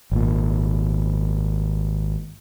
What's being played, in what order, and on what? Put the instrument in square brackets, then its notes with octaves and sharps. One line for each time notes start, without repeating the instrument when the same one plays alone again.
[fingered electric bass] G#1 A#2